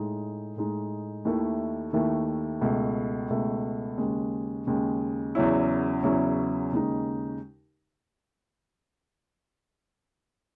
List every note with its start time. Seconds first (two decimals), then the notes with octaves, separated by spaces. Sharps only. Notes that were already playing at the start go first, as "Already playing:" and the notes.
Already playing: A2 G#3 D#4
0.56 A2 G#3 D#4
1.25 D#2 D#3 A3 E4
1.93 D#2 D#3 A3 E4
2.61 C#2 B2 A3
3.30 C#2 B2 A3
3.98 D#2 C#3 G#3
4.67 D#2 C#3 G#3
5.35 E2 C#3 F#3 C#4 E4
6.03 E2 C#3 F#3 C#4 E4
6.72 D#2 C#3 G#3 D#4